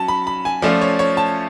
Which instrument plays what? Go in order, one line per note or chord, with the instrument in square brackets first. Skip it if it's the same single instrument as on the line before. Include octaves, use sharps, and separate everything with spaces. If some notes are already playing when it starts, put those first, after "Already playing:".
Already playing: [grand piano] F#3 C#4 A5
B5
B5
G#5
F3 A3 C#4 F4 D5
C#5
C#5
A5